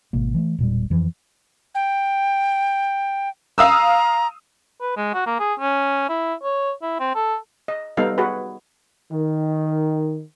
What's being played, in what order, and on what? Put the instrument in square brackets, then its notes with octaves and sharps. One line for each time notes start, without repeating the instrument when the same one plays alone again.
[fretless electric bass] G#1 B2 A#3
E3 G#3 A3
E1 A#2 G3
F2 E3 F3
[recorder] G5
[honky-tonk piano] F5 D#6 E6 [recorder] A#5
[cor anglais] B4
G#3
F#4
A#3
G#4
C#4
E4
C#5
E4
C4
A4
[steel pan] D#5
G3 B3 D#4 A4 F5
F#4 G#4 B4
[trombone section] D#3